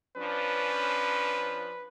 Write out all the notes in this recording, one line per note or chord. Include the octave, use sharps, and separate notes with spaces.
F3 C#4 D4 B4